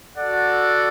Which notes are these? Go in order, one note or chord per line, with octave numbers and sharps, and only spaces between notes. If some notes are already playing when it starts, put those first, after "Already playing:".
F#4 A4 D5 F#5